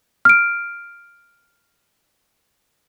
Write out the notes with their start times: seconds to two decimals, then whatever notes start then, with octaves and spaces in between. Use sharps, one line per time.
0.25 F6 D7